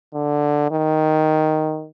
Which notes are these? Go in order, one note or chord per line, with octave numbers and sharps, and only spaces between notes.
D3
D#3